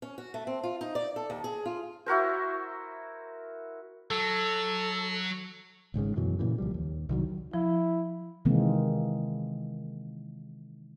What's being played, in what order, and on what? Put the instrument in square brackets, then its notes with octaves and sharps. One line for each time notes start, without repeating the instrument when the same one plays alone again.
[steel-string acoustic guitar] C#4
F#4
A3
C4
F4
D#4
D5
A4
D#2
G#4
F4
[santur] E4 F#4 A#4 C5
[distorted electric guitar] F#3 [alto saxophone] A4
[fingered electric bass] G#1 C#2 G#2 C#3
F#2 B2 E3 F#3
A#2 C#3 E3
C#2 F3 G3
D#2
C2 D#3 F#3
[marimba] F3 [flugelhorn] E4
[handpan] C3 D#3 E3 G#3 A#3 C4